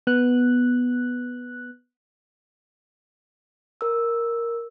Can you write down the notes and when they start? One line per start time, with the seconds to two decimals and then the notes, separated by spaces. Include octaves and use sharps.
0.07 B3 F#6
3.81 A#4 E6